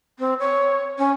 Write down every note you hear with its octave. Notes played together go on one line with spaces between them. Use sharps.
C4
C#5
C#4